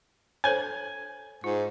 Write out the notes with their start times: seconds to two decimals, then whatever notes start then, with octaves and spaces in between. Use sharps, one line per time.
0.44 A4 C5 C#5 G#5
1.44 G#2 F4